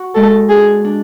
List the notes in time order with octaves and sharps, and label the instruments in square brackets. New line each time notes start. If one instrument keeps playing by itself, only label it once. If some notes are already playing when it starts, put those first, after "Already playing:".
Already playing: [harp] F#4
[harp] G#3 [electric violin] A4
[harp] D4 [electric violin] G#4
[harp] D4